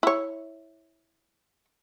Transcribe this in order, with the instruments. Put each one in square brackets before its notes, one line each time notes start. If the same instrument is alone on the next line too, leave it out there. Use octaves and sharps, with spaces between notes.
[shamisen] E4 C#5